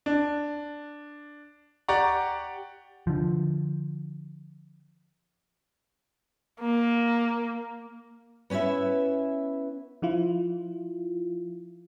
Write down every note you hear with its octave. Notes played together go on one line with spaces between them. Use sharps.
D4
G4 D5 F#5 A#5 C#6
D3 F3
A#3
B3 C#4 E4 B4 E5
F3 E4 F4